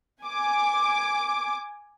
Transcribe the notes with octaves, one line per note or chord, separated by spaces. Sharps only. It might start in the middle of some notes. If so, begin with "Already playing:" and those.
G#5 D6